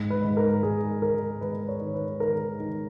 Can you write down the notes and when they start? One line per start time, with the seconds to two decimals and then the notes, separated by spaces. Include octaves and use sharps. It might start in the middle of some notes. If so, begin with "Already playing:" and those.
Already playing: G#2
0.10 B4
0.24 G#2
0.37 A#4
0.63 G#2 G#4
1.02 G#3 A#4
1.41 G#3 B4
1.68 C#5
1.81 D#3
1.94 B4
2.20 D#3 A#4
2.60 D#3